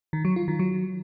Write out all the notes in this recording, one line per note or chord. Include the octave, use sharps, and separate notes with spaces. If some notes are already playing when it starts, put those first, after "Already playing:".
D#3
F#3
F4
D#3
F#3